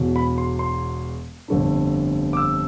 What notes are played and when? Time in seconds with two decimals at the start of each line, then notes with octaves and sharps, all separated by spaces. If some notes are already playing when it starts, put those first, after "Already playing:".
Already playing: E1 E2 B2
0.16 B5
0.38 C6
0.59 C6
1.48 G1 F2 D3 A3 D4
2.33 D6
2.37 E6